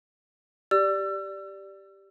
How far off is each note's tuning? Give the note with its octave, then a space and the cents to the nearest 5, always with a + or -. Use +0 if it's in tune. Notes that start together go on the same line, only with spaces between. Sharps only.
G4 +0 D5 +0 E6 +35